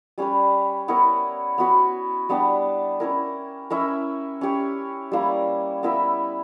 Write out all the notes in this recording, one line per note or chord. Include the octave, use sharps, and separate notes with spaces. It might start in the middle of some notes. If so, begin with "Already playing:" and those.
G3 C#4 G4 B4
B3 E4 A#4 C#5
B3 F#4 B4
G3 B3 D4 G4
C#4 E4 A#4
C#4 E4 A#4 E5
C#4 G4 C#5
G3 A#3 E4
B3 E4 A#4 E5